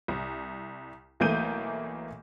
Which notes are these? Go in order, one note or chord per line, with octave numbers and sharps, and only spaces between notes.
C2
B1 E3 A3 A#3 G6 D#7